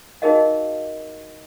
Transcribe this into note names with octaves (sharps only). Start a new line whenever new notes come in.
D#4 F#4 G#4 A#4 D#5 F5